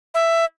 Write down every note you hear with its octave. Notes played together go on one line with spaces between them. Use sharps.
E5